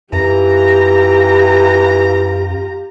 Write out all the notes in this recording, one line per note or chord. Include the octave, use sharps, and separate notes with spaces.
F#2 E3 F4 G4 A#5